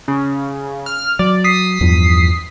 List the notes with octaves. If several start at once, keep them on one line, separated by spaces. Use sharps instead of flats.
C#3
F6
F#3 D5
D#6 B6 C7
E2 G2 F3